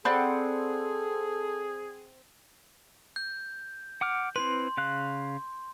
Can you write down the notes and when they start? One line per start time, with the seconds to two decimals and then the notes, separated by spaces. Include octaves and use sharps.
0.05 C4 G#4 A4 D5 F#5 B5
3.16 G6
4.01 F#5 D6 F6
4.36 C4 E4 B4 C6
4.77 C#3 F5 F#6